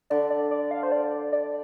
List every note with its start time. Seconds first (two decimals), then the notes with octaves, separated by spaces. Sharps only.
0.10 D3 D5
0.30 D5
0.51 D5
0.71 F5
0.83 C5
0.92 D5
1.32 D5